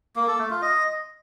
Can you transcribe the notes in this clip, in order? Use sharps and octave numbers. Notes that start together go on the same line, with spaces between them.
A#3
A4
A3
F4
D#5